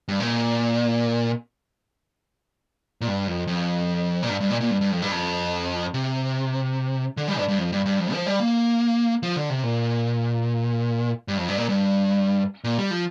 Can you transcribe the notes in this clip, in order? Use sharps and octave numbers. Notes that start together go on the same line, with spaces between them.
G2
A#2
A#2
G2
F2
F2
A#2
G2
G2
A#2
A#2
G2
G2
F2
G2
F2
C3
D3
G3
G2
G2
F2
G2
G2
F2
F3
G3
A#3
F3
D3
C3
A#2
G2
F2
G2
A#2
G2
A#2
G3
F3